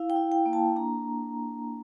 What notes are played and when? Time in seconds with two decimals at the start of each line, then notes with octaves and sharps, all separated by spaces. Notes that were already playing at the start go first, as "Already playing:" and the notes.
Already playing: E4 F5
0.10 G5
0.16 E4
0.32 G5
0.46 A#3
0.53 A5
0.76 D4 A#5